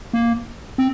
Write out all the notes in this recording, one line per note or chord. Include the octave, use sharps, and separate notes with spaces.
A#3
C4